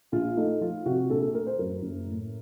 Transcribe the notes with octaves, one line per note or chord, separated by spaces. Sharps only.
A#1 F4
A3 D#4
F3 F4
C3 F#4
A#1 A4
A4
A3 A#4
C5
F#2 A#4
F#1
A2